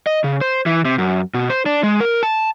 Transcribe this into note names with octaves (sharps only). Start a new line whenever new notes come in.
D#5
C#3
C5
E3
C3
F#2
B2
C5
D4
G#3
A#4
A5